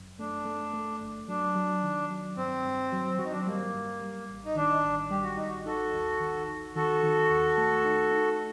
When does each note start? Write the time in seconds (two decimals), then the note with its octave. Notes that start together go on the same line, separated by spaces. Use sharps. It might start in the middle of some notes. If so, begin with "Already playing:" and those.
Already playing: G1 F#2
0.19 A3 D4
0.45 A3
0.74 A3
1.01 G1
1.28 F#3 D4
1.55 F#3
1.83 D#3
2.10 F#3
2.37 G2 C4
2.65 G2
2.92 F#3
3.17 F#3 F#4
3.24 D#4
3.32 D4
3.40 C4
3.47 G3 A#3
3.74 G2
4.01 G3
4.29 A1
4.45 D#4
4.56 D#3 D4
4.83 A1
5.10 G3 G4
5.23 F#4
5.36 A1 D#4
5.49 F#4
5.66 D#4 F#4 A4
5.93 D#2
6.20 D#3
6.48 D#3
6.76 D#3 F#4 A4
7.03 D#3
7.30 D#2
7.58 A3
7.85 D#4
8.11 D#4